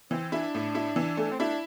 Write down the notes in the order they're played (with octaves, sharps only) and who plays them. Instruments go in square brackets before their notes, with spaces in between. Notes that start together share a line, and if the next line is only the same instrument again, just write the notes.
[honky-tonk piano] E3 [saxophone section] C4
[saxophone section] D4 [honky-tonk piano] E4
[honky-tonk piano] A2
E4
E3
A3
[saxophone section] C4
[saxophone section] D4 [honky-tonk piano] E4